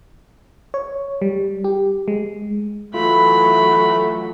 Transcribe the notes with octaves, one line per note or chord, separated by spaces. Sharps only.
C#5
G3
G4
G#3
E3 F#3 A3 F4 B5